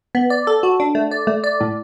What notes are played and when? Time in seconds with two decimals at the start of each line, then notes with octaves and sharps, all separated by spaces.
0.15 B3
0.30 D5
0.47 A4
0.63 F#4
0.80 D4
0.95 A3
1.11 D5
1.27 A3
1.44 D5
1.61 A2